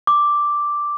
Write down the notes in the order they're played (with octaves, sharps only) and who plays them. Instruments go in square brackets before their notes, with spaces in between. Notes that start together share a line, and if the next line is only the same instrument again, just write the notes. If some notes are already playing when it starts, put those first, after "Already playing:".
[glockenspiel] D6